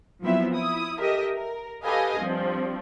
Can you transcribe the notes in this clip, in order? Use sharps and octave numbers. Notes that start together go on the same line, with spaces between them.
F3 F#3 B3 C4 E4 E5
E4 D#6
G4 A4 A#4 D#5 E5
A#4
G4 A4 B4 D#5 F5 G#5
G2 F3 C4